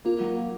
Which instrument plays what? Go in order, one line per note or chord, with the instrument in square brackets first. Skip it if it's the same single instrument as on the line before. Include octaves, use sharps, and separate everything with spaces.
[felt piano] A#3 [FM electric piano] F4
[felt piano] F#3
A#3